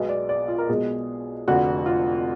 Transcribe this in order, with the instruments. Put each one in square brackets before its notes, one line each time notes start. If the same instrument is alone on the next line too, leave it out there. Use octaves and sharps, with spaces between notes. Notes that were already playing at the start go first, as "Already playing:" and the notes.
Already playing: [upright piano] B1 B2 G#3 B3
D5
D5
F4
A#4
B1 B2 G#3 G#4
F1 F2 D3 F#4
F4